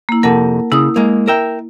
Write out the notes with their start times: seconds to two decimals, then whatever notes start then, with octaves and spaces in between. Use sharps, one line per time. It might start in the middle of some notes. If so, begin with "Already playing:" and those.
0.09 A#3 E4
0.23 F2 C3 A#4 F#5 A5
0.72 C#3 E4 D#6
0.96 G#3 A#3
1.28 A#4 E5 G5